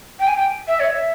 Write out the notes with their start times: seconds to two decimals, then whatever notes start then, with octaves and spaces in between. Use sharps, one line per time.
0.19 G5
0.27 G#5
0.35 G5
0.68 E5
0.80 C#5
0.90 E5